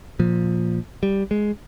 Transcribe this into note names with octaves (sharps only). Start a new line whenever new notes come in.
A#2 F3
G3
G#3